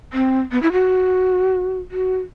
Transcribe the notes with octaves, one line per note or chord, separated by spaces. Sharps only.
C4
B3
E4
F#4
F#4